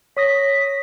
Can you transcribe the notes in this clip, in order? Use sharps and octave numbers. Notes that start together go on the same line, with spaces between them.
C#5 D#6 A#6 B6